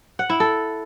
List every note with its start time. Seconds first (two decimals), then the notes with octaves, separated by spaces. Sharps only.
0.19 F#5
0.30 E4
0.40 A4